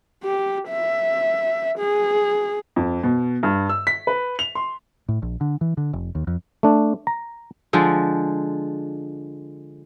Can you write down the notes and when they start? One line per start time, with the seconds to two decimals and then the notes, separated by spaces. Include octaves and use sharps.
0.23 G4
0.69 E5
1.78 G#4
2.76 F2
3.03 B2
3.43 G2
3.69 E6
3.87 B6
4.07 B4
4.39 F7
4.55 C6
5.08 A2
5.22 A#1
5.41 D3
5.61 E3
5.77 D3
5.93 F1
6.15 D#2
6.27 F2
6.63 A3 D4
7.07 A#5
7.73 D3 F3 G#3